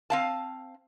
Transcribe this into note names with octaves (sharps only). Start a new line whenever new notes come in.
C4 F5 A5